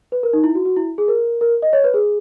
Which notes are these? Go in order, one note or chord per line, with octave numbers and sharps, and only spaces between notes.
B4
A#4
D#4
E4
F#4
F#4
E4
G#4
A#4
A#4
D#5
C#5
B4
G#4